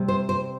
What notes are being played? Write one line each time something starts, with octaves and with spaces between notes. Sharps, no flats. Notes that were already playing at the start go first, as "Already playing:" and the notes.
Already playing: C3 G3
C5
C5